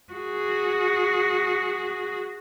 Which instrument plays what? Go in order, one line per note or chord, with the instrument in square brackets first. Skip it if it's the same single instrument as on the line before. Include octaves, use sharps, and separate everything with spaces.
[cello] F#4 G#4